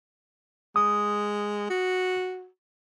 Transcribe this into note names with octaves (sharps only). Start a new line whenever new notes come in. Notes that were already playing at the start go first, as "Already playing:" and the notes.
G#3 D#6
F#4